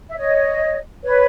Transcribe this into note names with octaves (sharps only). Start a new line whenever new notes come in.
E5
C#5 D#5
B4 C#5